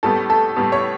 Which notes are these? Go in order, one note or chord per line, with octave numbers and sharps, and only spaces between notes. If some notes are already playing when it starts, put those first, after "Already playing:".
A2 G3 B3 A4
A4
A2 G3 B3
C#5